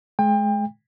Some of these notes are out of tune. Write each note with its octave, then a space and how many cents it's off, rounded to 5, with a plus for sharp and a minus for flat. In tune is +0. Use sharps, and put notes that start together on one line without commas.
G#3 +30 G5 +35